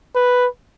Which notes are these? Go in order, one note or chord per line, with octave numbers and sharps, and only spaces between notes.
B4